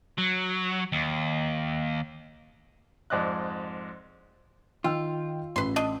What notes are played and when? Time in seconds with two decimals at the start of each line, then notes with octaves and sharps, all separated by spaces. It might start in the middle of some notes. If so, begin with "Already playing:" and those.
0.18 F#3
0.92 D#2
3.10 F2 G#2 D5 D#5 F#6
4.84 D#3 F4 G5 E6
5.56 A1 B4 C6
5.76 D4 D#5